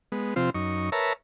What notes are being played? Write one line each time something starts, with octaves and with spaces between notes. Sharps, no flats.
G#3 B3
C3 F3 C4 F4 C5
F#2 D#4 C#6
A#4 B4 C#5 E5 A5 A#5